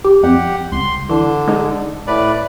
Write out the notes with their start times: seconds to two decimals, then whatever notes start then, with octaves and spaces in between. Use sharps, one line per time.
0.04 G4
0.23 F2 G4 F#5
0.72 C#2 C6
1.09 D3 E3
1.48 G#3 D#4
2.07 A2 B4 D5